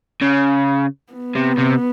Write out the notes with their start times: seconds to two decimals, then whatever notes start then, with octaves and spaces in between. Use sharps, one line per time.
0.21 C#3
1.13 B3
1.36 C3
1.58 C3